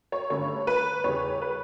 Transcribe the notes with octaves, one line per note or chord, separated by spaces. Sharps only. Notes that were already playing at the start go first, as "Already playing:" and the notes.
C#5
G2 D3 A3 C#4 C#5
B4
E2 C#3 G3 C#5
B4